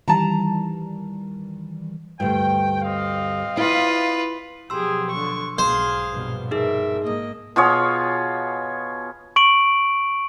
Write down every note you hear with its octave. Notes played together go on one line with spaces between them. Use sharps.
D#3 E3 G3 A5 A#5
D2 G2 G5
C4 D#5 F5
E4 F4 B4
B2 F3 F#3 G4 G#4 C6 E6
D3 C#6
B1 G#2 G#4 C5 F5
A#1 G2 B2
D#4 G#4 A#4 E5
G#2 A#3 D#5
B2 F4 G#4 C#5
C#6 D7 F#7